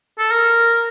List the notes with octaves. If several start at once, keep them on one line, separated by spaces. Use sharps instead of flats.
A4
A#4